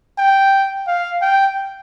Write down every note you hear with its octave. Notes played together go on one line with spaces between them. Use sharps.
G5
F5
G5